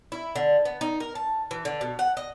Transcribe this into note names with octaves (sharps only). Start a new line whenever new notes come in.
E4
D3
B3
D#4
A#4
A5
E3
D3
B2
F#5
D#5